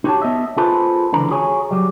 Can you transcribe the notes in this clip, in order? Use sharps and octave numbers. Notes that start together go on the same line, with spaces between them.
D#4 F#4 G4 C5 C#5 A5
B3 D#5 E5
F4 G#4 A4 B4 C5
C#2 D3 E3 A#5
F#4 G#4 C#5 G#5
F#3 G3